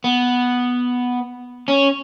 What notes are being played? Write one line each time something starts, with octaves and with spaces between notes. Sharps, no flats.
B3
C#4